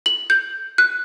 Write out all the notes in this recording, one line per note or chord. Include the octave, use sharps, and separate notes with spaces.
F#7
G6
F#6